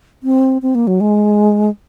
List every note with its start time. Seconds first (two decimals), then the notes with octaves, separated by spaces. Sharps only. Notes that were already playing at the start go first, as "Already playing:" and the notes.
0.23 C4
0.62 C4
0.75 A#3
0.87 F#3
1.01 G#3